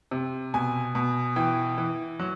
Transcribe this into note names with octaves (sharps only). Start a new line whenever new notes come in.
C3
B2 G#5
B2
E3 G5
E3
F#3